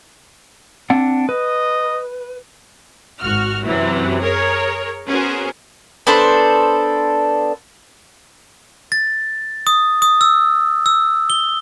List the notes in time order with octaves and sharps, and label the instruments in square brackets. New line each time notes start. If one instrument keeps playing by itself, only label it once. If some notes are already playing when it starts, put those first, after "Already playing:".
[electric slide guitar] C4 D4 F#5
[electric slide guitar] B4 [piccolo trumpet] D#5
[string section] G#1 F#4 F6
F#2 C3 E3 F#3
G#4 A#4 C#5
B3 C#4 F#4 G#4 A#4 C5
[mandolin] B3 D4 A4 C5
[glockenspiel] A6
D#6
D#6
E6
E6
G7